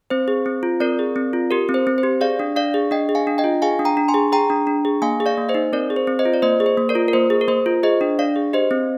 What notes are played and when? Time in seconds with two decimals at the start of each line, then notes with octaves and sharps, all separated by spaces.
0.10 C4 C5
0.28 G#4
0.46 C4
0.63 F4
0.80 C4 A#4 D5
0.99 G#4
1.16 C4
1.33 F4
1.51 G4 A#4
1.69 C4
1.74 C5
1.87 C4
1.98 C5
2.03 G4
2.21 G#4 D5 F5
2.39 D4
2.56 D4 D5 F5
2.74 G#4
2.91 D4 D#5 G5
3.09 G#4
3.15 F5 G#5
3.27 D4
3.38 D#5 G5
3.44 F4
3.62 G#4 F5 G#5
3.79 D4
3.85 G5 A#5
3.97 D4
4.08 G#5 C6
4.14 G#4
4.32 G#4 G5 A#5
4.50 D4
4.67 D4
4.85 G#4
5.02 A#3 F5 G#5
5.20 G#4
5.26 D5 F5
5.38 A#3
5.49 C5 D#5
5.55 D#4
5.73 C4 A#4 D5
5.90 G#4
5.96 C5
6.07 C4
6.19 C5 D#5
6.25 F4
6.34 D5
6.42 A#3 C5 D#5
6.60 G#4
6.66 C5
6.77 A#3
6.89 A#4 D5
6.95 F4
7.08 A#4
7.13 A#3 C5
7.30 G#4
7.41 A#4
7.48 A#3 C5
7.66 F4
7.83 G#4 C5 D#5
8.01 D4
8.19 D4 D5 F5
8.36 G#4
8.53 G4 C5 D#5
8.71 C4